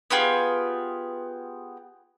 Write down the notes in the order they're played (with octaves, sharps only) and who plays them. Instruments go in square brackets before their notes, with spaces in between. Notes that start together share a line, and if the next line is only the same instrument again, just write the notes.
[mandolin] B3 F4 G4 G#4